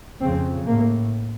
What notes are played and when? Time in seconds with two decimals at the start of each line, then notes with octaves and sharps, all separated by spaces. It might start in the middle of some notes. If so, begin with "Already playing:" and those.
0.22 F2 C#3 C4
0.68 A2 A#3